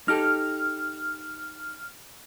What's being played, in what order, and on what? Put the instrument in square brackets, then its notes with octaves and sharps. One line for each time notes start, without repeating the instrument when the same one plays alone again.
[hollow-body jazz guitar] D#4 G4 A4 [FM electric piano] F6